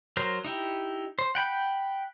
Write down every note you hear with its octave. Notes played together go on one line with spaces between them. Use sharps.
F#3 A#4 C5
D#4 E4 G4
C5
F#5 G5 B5 G6